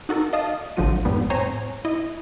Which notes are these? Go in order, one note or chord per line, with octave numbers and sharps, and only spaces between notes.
D#4 F#4 A4 A#4
D5 D#5 F5 A5 D#6
A1 D3 F3 F#3 F#4 D#7
F2 G#2 G3 G#3 B3
A2 C4 C5 C#5 G#5 A#5
E4 D#5